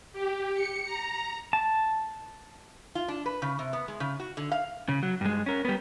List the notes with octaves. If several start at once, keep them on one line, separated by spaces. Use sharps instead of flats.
G4
C#7
A#5
A5
F4
D4
B4
C#3
C3
B3
G#3
C#3
F#4
D3
F5
C#3
F#3
G2 G#3
C#4 A#4
G3 B3